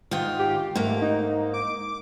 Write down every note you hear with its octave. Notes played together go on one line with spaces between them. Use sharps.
G#2 D#3 F4
G4
G#2 A3 A#3
D#4
D6